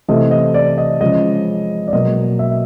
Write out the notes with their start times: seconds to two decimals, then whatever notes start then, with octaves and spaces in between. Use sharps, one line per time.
0.08 C3 E3 A3 C4 D#5
0.31 D#5
0.54 D5
0.78 D#5
1.00 C#3 F3 G#3 D#5
1.88 D5
1.93 B2 F#3 A#3 D#5
2.39 E5